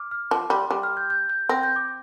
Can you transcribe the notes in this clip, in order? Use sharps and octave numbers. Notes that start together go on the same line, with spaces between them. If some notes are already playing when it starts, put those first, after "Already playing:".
Already playing: D6 F6
F6
F3 D6
G3 C6
G3 D6
F6
G6
G6
G6
C4 A#6
G6
D6